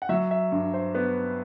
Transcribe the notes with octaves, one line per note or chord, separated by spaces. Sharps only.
F#5
F#3 E5
E5
G2
C5
B3 B4